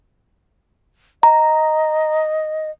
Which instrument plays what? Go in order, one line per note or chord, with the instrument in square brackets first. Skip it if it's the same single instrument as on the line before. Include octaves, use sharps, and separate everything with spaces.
[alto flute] D#5 [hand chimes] A#5